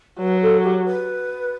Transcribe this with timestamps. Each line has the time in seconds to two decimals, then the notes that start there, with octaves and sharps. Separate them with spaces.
0.20 F#3 B4
0.42 A4
0.62 G4
0.85 B4